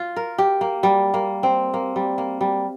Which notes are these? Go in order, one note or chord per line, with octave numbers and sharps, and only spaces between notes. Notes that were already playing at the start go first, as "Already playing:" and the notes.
Already playing: F4
A#4
G4
A#3
G3
A#3
C4
A#3
G3
A#3
G3